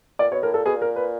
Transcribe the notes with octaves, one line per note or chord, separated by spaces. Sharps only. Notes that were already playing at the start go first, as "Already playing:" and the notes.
A#2 D5
B2 C#5
A2 A#4
A#2 A4
B2 G#4
A#2
A#4
B4